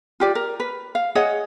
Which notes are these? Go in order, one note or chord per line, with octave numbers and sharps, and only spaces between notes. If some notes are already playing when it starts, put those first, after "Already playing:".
F4 G4 D5
A#4
B4
F5
G#4 C#5 D#5 F#5